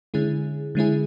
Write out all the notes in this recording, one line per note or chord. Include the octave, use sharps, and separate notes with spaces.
D3 G#3 C#4 E4 G#4
D3 G#3 C#4 E4 G#4